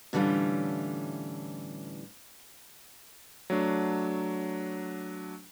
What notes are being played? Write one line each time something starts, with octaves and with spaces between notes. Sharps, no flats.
A2 D3 E3 G3 C#4 F4
F#3 A3 D4